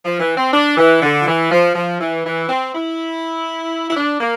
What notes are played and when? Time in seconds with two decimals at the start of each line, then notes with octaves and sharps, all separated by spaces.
0.04 F3
0.20 E3
0.37 C4
0.53 D4
0.77 E3
1.02 D3
1.22 F3
1.27 E3
1.51 F3
1.75 F3
2.00 E3
2.25 E3
2.49 C4
2.74 E4
3.90 E4
3.97 D4
4.20 A#3